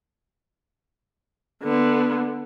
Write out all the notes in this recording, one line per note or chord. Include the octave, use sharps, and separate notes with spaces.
D3 B3